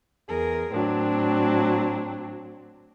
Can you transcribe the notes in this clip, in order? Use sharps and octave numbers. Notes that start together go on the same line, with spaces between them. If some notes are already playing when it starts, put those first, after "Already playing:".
E2 G#4 A#4
A2 F#3 C4 D4